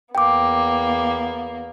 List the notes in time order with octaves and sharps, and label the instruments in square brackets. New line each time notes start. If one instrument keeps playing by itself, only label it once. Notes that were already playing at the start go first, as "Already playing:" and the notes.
[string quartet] E2 A#3 B3 [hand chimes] G5 D6